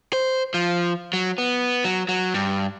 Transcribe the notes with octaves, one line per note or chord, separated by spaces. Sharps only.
C5
F3
F#3
B3
F#3
F#3
G2